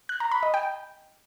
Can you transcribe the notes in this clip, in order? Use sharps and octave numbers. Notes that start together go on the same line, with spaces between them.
F#6
A#5
B5
D#5
G5